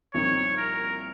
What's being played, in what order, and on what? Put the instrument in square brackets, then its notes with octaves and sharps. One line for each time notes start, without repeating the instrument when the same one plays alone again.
[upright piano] C2 A#2 F3 C4 D#4 [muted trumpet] C#5
[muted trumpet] A#4